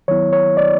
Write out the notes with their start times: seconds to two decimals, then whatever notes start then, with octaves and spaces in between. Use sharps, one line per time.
0.08 D#3 F#3 B3 E4 C#5
0.33 C#5
0.57 D5